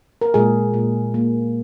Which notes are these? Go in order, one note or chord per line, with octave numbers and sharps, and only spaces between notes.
A#4
A#2 G#3 G#4
A#2
A#3